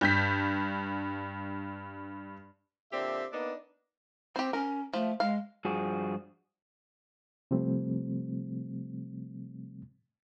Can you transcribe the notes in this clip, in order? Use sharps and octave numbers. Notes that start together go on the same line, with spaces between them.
G2 G6 B6
A#2 D3 C4 G4 D5 E5
A#3 B3 D4 D#4 B4 D5
C4 G4 C5
C#4 A#4
F3 A3
G#3 F5
G2 F3 F#4 G#4
C3 F3 G3 A3 C4